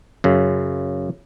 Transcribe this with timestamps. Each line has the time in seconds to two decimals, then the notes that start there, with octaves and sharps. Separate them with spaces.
0.24 F#2 C#3